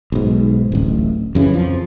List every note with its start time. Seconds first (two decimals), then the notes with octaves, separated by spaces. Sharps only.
0.12 B1 G#2
0.72 D1 A1
1.35 F#2 C#3 E3
1.54 F2 F3